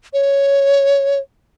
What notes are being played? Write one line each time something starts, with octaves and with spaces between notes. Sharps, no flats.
C#5